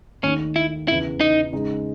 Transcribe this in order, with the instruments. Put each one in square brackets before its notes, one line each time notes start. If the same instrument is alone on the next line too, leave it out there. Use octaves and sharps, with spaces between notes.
[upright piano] D#2 D#3 A3 D#4 [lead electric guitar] C#4
[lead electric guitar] E4
[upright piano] E2 C#3 E3 [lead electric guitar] E4
[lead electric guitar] D#4
[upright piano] C#3 G#3 D#4